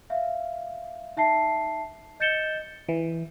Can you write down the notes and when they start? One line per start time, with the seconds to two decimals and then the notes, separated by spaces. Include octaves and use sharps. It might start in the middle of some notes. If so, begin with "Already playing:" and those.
0.10 E5 F5
1.17 D#4 E5 A5 C7
2.20 D#5 G6 A6 C#7 E7 G7
2.89 E3